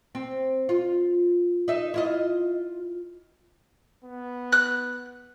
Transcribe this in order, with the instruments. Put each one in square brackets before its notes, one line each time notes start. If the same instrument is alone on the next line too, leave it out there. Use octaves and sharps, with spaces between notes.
[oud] C4
F4
D#4 E5
E4 F4 D#5
[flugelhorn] B3
[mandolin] F#6